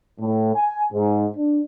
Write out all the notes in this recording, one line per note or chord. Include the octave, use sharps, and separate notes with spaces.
A2
G#5
G#2
D4